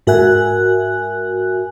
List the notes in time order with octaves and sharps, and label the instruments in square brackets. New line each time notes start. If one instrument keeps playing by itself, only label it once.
[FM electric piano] G#2 F#4 A#4 E5 G#5 F#6